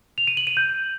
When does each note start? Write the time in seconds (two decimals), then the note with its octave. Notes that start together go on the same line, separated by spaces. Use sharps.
0.18 F7
0.27 D#7
0.37 F#7
0.47 D#7
0.57 G6